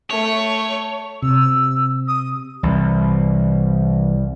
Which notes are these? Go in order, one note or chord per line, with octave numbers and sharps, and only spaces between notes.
A3 C#5 C#6
C3 E6
D#6
C2 E3